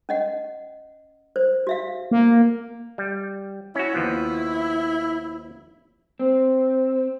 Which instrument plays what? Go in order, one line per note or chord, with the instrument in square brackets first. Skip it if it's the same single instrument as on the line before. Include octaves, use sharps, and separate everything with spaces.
[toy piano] C#4 D#5 F#5
C5
F#4 E5 F5
[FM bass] A#3
[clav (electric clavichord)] G3
[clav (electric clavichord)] C#4 F#4 [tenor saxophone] E4
[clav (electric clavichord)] D#2 F3 B3
[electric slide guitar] C4